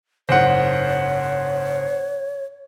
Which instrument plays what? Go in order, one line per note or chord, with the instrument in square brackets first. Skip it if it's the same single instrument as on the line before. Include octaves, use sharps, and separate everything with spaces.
[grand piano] F#1 G#2 [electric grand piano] C5 F#5 [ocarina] C#5